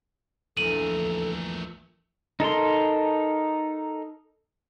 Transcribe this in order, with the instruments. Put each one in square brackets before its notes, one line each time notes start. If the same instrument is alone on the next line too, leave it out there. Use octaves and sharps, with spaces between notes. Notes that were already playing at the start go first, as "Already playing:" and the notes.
[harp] A#1 E2 [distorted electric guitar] A3 A#4 [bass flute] A4 [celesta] D#7 F#7
[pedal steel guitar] D#4 A4 A#4 C6